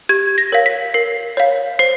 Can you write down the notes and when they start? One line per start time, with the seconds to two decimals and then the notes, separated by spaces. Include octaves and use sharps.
0.09 G4 G#6
0.38 A#6
0.52 A#4 C#5 F5
0.66 B6
0.94 A#4 C7
1.37 C#5 F5
1.79 C5 C7